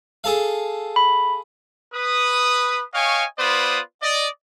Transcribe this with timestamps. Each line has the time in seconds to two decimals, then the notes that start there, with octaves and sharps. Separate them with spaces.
0.24 G#4 A4 F5
0.96 B5
1.94 B4 D#6
2.94 C#5 D#5 F5 G5 G#5 C#6
3.39 B3 F4 B4 C5 D5 D#6
4.03 D5 D#5